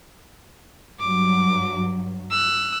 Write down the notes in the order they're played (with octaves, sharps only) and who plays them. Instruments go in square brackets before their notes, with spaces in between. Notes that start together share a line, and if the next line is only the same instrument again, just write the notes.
[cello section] G2 F#3 [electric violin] D6
[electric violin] E6 F#6